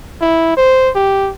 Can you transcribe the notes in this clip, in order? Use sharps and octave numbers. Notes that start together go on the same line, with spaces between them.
E4
C5
G4